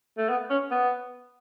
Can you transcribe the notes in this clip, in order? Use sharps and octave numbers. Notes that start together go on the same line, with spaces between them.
A3
B3
C#4
B3